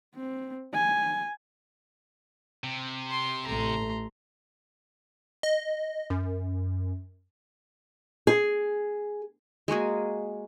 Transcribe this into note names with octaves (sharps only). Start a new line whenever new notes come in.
C4
G#5
C3
C6
A1 A3 A#5 C6
D#5
F#2
G#4
G#3 A#3 F#4 G#4